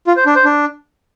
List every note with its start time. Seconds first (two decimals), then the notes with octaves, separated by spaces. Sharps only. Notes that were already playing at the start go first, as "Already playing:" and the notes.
0.07 F4
0.16 C5
0.26 D4
0.35 C5
0.45 D4